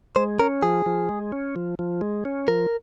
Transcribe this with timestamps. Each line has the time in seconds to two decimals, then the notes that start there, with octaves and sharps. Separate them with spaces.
0.16 G#3 C5
0.39 C#4 A#4
0.63 F3 G#4
0.86 F3
1.09 G#3
1.32 C#4
1.56 F3
1.79 F3
2.01 G#3
2.25 C#4
2.48 F3 A#4